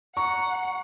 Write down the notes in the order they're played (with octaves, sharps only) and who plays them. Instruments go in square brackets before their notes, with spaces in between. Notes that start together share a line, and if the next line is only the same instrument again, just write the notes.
[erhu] F#5 [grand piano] A#5 C#6